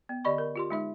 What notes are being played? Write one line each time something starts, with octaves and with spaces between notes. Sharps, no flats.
B3
D3 G4 D5 D#5 B5 C#6
A#4
F4 G4 C6
G#3 D#4 E5